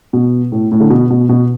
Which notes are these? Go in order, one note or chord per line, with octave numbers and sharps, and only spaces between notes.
B2
A2
A2
D3
B2
B2
B2